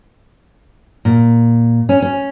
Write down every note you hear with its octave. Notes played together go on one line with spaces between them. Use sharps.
A#2
C#4
C#4